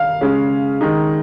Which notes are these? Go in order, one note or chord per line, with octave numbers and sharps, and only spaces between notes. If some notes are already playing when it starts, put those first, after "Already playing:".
Already playing: F5
C#3 G#3 C#4
D#3 G#3 D#4